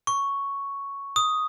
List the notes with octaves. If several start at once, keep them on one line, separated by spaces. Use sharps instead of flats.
C#6
D#6